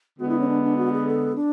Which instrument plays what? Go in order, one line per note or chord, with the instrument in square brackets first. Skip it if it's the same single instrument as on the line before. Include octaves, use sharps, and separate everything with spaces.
[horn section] D3 G#3 B3 [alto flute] F#4
[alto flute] E4
C#4
D4
D4
F#4
G#4
A4
D4